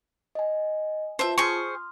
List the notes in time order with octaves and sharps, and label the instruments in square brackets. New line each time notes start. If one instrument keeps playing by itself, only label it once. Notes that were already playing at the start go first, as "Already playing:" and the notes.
[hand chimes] D#5 G#5
[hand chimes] F4 A5 [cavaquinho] C5 E5
[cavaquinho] G#4 C5 C#6 [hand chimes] C6 D#6 F6